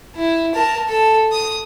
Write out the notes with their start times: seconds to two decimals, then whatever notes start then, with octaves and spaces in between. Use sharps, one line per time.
0.16 E4
0.55 A#4 A5
0.89 A4
1.32 D#6